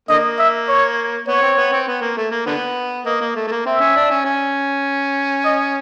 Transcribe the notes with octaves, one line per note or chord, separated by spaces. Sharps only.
D3 A#3 D#5
E5
C#5
B3 C#5
C4
B3
C4
B3
A#3
A3
A#3
D3 B3
A#3 D#5
A#3
A3
A3
A#3
C4 E5
C#4
D4
C#4
C#4
D#5